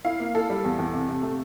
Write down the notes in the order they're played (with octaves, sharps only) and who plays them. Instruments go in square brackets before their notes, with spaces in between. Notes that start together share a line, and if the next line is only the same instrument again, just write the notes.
[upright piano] E4 [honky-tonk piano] F5
[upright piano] A#3
[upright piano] E4 [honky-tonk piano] A4
[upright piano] G3
E2
E2
C3
C3
A3